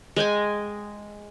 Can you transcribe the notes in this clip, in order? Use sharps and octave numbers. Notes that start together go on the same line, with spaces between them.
G#3 D#5 G5 G#5